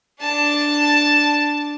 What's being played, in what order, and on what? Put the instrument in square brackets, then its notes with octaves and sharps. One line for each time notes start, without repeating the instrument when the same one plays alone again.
[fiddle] D4 A5